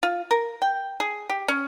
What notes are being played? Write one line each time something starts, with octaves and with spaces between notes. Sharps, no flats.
F4
A#4
G5
G#4
G4
C#4